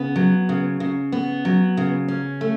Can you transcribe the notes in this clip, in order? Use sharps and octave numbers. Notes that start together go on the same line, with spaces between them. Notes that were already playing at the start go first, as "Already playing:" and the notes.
Already playing: C#3 B3
F#3
C#3
C#3
B3
F#3
C#3
C#4
A3